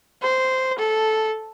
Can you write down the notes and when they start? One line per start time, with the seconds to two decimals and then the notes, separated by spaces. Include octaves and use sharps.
0.22 C5
0.78 A4